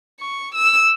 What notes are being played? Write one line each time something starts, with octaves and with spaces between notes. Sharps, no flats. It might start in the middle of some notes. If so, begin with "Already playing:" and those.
C#6
E6